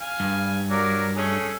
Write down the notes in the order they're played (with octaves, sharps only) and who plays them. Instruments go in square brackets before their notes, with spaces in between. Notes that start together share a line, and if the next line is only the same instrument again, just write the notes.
[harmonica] F5 G#5
[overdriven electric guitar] G2
[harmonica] F#3 A#4 D5
A3 C#4 G#4